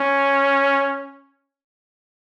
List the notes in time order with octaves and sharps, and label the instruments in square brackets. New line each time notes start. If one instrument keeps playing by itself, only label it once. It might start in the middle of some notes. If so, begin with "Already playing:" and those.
Already playing: [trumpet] C#4